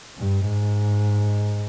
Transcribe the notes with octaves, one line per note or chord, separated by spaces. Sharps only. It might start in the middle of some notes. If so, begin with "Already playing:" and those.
G2
G#2